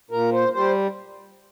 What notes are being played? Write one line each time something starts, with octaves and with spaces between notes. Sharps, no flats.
A#2 A#4
C5
G3 C5